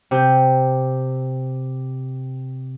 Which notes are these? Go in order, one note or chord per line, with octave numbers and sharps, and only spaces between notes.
C3 G6